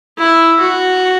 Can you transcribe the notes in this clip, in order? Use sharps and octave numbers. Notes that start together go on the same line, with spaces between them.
E4
F#4